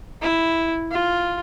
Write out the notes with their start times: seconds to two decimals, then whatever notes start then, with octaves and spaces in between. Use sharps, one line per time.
0.22 E4
0.91 F4